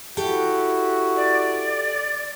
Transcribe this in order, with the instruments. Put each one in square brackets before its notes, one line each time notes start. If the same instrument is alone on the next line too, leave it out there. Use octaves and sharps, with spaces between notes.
[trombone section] E4 F#4 [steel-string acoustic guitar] G4 A4 G5
[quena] D5